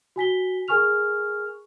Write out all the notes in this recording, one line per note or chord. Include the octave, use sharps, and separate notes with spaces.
F#4 G#5 B6 G7
G#4 A#4 G#5 C#6 F6 F7